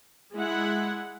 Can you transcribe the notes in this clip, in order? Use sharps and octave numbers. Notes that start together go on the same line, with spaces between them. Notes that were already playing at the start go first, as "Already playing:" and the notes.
G#3 E4 F#5